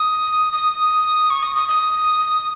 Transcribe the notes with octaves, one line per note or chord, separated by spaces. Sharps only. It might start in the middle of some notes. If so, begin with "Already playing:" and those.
Already playing: D#6
D#6
C#6
D#6
D#6
D#6